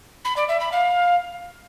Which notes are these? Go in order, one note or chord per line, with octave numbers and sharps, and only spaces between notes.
B5
D5
E5
B5
F5